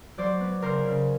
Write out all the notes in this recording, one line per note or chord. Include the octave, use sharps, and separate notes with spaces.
F#3 C5 D5
B3
C#3 A#4 C5
C#3